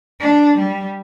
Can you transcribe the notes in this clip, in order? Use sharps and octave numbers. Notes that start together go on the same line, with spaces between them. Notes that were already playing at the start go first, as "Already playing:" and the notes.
D4
G3